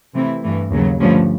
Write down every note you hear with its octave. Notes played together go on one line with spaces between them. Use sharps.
C3 E3 A3 C4 E4
G2 E3 A3
D#2 C#3 F#3
G2 D3 F3 A3 C#4